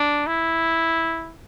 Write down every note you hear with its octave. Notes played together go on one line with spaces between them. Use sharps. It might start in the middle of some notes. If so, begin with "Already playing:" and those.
Already playing: D4
E4